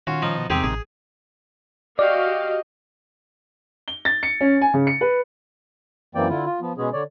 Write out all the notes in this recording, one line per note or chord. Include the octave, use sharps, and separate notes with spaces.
D#3 C#4 F4 F#4
F3 D#4
B2
E2 C3 D#3 C4 G4 G#4
A1 G#4
F#4 G4 D5 D#5 F5
G7
A6
C#7
C#4
G#5
C#3
C#7
B4
F#2 E3 A#3 C4 D5 G5
D3 E4 F4
F4
F3 B3
B2 G#3 B3 C#4 G#4
D3 C#5 D5